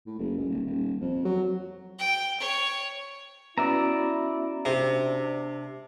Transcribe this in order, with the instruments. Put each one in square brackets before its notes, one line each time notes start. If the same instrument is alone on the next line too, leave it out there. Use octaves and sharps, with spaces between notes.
[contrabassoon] A2
F#1
C#2
D#1
D#1
F2
F#3
[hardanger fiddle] G5
C#5
[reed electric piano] B3 C#4 F#4 [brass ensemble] E4 [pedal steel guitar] D5 E5 A#5
[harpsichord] C3 [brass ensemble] D4